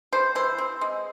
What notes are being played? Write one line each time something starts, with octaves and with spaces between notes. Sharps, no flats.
G3 C5
E3 C5
C4
G#3